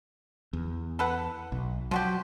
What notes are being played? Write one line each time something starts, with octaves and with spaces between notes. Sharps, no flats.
E2
A4 B4 F#5
B1
F3 F#3 F#4 G4